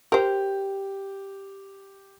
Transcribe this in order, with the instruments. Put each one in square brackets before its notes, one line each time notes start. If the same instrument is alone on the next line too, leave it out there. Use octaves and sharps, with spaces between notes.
[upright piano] G4 [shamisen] A#4 C5